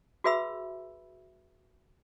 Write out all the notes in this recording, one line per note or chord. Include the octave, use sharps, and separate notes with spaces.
F#4 G#4 B4 E5 B5 E6